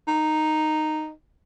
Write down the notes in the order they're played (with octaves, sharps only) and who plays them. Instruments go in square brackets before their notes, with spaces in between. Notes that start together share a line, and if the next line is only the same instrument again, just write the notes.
[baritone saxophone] D#4